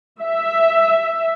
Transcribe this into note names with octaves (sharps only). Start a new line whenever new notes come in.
E5